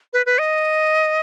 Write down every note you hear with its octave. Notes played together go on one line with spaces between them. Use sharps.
B4
B4
D#5